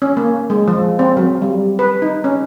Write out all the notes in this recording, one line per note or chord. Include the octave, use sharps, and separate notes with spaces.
C#4
A#3
G#3
F3
C4
F#3
G3
B4
D#4
C#4